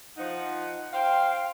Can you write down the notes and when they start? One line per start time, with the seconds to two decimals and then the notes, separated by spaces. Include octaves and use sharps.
0.17 F3 D#4 F#5
0.93 C5 F5 G5